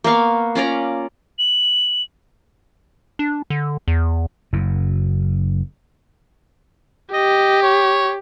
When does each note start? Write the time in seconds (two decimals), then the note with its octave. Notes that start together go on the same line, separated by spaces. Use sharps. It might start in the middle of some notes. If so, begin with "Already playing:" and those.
0.04 A#3 B3 F5 C#6
0.55 C#4 F4 D5 A#5
1.39 F#7
3.19 D4
3.50 D3
3.88 E2
4.53 F#1 F#2
7.13 G4 D#5
7.63 C#5